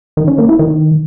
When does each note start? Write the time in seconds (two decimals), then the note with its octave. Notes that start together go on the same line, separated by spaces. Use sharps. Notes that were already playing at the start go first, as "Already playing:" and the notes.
0.17 D#3
0.28 C#4
0.38 A#3
0.49 E4
0.59 D#3